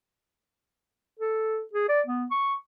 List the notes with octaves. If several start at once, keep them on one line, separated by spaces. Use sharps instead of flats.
A4
G#4
D5
B3
C#6